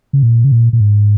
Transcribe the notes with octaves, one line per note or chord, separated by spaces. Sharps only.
C#3
A#2
C#3
A#2
A#2
G#2